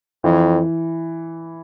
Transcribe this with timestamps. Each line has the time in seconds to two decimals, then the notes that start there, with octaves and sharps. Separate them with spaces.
0.24 F2 E3